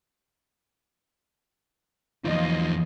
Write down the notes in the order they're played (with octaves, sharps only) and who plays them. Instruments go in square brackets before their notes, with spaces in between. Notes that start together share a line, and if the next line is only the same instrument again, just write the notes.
[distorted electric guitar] E2 D#4 [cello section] F3 F4 D#5